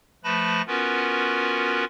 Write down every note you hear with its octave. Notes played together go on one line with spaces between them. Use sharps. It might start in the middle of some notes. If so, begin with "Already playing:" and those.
F3 A3 B4 A5 B5 A#6
B3 C#4 F4 F#4 A#4 B4